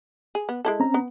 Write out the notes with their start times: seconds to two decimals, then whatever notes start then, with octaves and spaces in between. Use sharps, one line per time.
0.35 G#4
0.49 B3
0.65 G#3 E4 A4
0.80 C4 C#4 A#5
0.94 B3